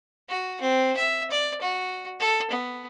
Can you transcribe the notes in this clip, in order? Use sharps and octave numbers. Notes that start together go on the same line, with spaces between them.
F#4
C4
E5
D5
F#4
A4
B3